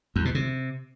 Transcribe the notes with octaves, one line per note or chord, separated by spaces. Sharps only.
E2
B2
C3